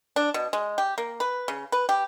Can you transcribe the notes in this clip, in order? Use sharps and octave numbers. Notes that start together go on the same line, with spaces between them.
D4
B2
G#3
G4
A#3
B4
C#3
B4
G4